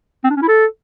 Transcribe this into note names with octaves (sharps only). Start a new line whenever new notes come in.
C4
D4
C#4
E4
A4